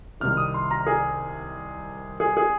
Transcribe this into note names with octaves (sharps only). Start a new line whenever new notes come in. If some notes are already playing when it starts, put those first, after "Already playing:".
C2 C3 D#3 F6
D#6
C6
A#5
G#4
G#4
G#4